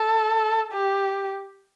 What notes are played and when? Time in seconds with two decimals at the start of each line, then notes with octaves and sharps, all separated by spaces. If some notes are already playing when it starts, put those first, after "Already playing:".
Already playing: A4
0.73 G4